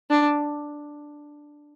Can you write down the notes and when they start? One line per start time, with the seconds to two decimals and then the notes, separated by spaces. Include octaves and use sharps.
0.10 D4